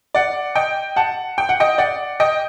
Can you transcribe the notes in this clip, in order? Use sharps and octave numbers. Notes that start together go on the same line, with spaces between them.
D5 F#5
D#5 G5
F#5 A5
G5
F#5
D#5 G5
D5 F#5
D#5 G5